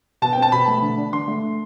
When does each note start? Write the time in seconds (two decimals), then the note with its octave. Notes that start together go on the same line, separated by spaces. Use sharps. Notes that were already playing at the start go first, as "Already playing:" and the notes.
0.22 B2 A5
0.33 G5
0.37 C4
0.42 A5
0.52 B2 B5
0.68 A3
0.82 D3
0.97 D4
1.13 D3 C6
1.28 A3